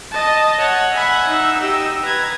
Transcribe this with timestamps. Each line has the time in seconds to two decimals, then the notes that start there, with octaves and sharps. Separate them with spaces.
0.12 D#5 A5
0.57 C#5 F#5
0.94 E5 F#5 G#5 B5
1.28 D#4 E6
1.58 G4 D#5
2.02 B4 A#5 G#6